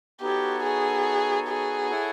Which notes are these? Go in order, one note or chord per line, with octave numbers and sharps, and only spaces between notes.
B3 D#4 F#4 G4 A4 C#5
G#4
G#4
E4 A4 C#5 F#5